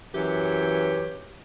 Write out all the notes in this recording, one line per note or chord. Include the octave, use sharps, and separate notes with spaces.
F#2 E3 G4 B4 C#5